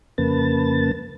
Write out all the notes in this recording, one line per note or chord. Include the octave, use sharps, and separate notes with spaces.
F2 C#3 A#3 B4 A5 A6